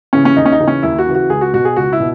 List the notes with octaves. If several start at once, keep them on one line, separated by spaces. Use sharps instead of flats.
C#3 E3 C#4
C#4
D#2 D#4
C#4
D#4
C#3 E3
C#4
D#2 E4
F#4
C#3 E3
F#4
C#2 G#4
F#4
B2 F#4
G#4
C#2 F#4
E4
B2